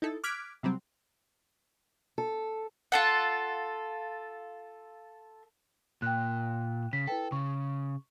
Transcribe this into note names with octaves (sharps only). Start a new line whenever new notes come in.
D#4 E4 A4
D6 F6 F#6 G#6 B6 D7
C3 F#3 G3 C4
A4
F4 A4 F#5
A#2 G5 F#6
C#3 B6
E4 A4 B4 G5
C#3 C#6